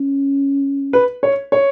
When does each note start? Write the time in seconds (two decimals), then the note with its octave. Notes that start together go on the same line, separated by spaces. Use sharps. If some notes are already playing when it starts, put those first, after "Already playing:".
Already playing: C#4
0.93 B4
1.23 C#5
1.52 C#5